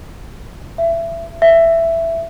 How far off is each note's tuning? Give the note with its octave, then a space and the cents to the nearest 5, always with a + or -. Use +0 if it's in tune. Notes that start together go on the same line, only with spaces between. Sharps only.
E5 +25
E5 +10